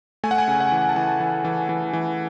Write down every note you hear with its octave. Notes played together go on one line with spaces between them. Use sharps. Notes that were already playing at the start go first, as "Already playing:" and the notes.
A3 G#5
F#5
G#5
C#3
F#5
E3
A5
E3 G#5
E3
E3
E3
E3